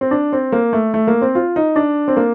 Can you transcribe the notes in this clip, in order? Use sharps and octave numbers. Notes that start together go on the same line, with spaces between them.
C4
D4
C4
A#3
A3
A3
A#3
C4
F4
D#4
D4
C4
A#3